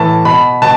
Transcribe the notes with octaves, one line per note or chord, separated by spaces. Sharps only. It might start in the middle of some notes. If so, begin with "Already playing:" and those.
Already playing: A2 E3 A5
B2 B5
B2 A5